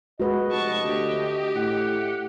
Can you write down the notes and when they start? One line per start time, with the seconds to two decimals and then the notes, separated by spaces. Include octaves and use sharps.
0.20 G#3 F#4 B4 D#5
0.52 F1 A5 C#6
0.84 D2 G4
1.55 A2 F#5